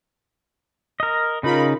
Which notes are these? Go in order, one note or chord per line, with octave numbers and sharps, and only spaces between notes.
A#4 D#5
C#3 D#4 F4 A#4 B5